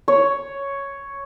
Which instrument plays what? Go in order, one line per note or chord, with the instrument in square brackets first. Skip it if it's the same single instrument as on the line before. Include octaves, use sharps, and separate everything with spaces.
[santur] C#5